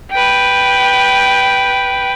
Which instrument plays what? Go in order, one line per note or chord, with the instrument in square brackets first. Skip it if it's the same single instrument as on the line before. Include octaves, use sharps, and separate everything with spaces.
[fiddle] B4 G5